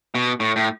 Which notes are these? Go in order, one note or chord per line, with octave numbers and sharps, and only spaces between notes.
B2
A2
A2